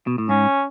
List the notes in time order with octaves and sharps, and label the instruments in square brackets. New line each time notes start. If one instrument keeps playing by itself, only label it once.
[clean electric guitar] B2
A2
[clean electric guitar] G#2 [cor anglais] C#4